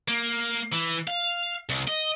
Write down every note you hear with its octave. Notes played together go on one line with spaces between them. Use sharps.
A#3
E3
F5
C2
D#5